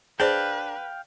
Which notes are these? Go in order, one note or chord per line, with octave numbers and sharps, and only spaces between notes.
D4 G#4 B4 C5 F5 G5